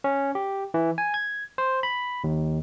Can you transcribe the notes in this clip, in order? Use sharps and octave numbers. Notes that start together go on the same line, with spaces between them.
C#4
G4
E3
G#5
G#6
C5
B5
D#2